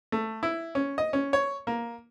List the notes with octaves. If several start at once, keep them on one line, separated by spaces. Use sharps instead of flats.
A3
E4
C#4
D#5
C#4
C#5
A#3